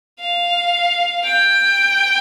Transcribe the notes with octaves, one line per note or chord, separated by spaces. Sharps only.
F5
G5